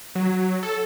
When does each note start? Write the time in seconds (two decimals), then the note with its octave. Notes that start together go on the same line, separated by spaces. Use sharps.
0.15 F#3
0.63 A4